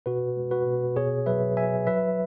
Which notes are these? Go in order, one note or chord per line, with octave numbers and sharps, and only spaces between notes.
B2 F#4 B4
G#3
F#4 B4
B2
B2 G#4 C#5
F#3 B4 E5
F#3 E5 G#5
F#3 B4 E5